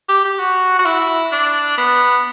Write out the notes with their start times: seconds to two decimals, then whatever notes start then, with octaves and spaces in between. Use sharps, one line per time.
0.09 G4
0.25 G4
0.39 F#4
0.79 F#4
0.85 E4
1.32 D4
1.78 B3